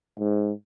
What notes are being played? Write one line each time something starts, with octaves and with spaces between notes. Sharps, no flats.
G#2